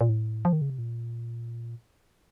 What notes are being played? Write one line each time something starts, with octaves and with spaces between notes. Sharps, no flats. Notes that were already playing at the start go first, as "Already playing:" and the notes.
A#2
A2
F3
D#3
C#3
C3
A#2